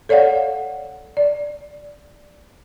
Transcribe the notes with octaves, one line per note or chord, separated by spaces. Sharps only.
A4 C#5 D5 F5 F#5
D5